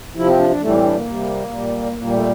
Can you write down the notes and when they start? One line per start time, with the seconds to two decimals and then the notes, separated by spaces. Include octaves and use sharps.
0.16 C3 F3 E4
0.26 C4
0.39 D4
0.50 D4
0.61 A2 E3 G3 A3
0.73 C4
0.84 D4
0.94 A#3
1.06 C3 G3
1.52 A#2 G3
1.97 A#2 G3 A#3
2.12 A3